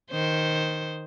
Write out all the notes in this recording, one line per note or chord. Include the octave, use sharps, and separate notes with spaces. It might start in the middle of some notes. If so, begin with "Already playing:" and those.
D#3 C5